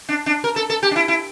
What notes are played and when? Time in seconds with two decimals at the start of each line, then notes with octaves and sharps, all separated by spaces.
0.09 D4
0.26 D4
0.44 A#4
0.56 A4
0.70 A4
0.83 G4
0.91 D4
0.96 E4
1.08 E4